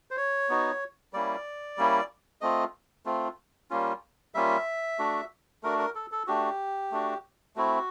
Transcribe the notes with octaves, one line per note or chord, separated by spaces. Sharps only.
C5
C#5
B3 D#4 F#4
G3 A#3 C#4 E4 D5
G3 A#3 C#4 E4
A3 C4 F4 D#5
A3 C4 F4
G3 A#3 C#4 F4
G3 A#3 C#4 F4 E5
A3 D4 F#4
A3 D4 F#4 A#4
A#4
A4
A4
A3 D4 F#4 G4
A3 D4 F#4
A3 C4 E4 F#4